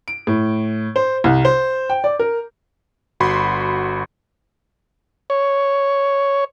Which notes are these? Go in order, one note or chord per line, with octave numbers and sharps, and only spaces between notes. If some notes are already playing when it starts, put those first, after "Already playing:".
D7
A2
C5
C2
C5
G5
D5
A#4
G1 F#4 B5 C6
C#5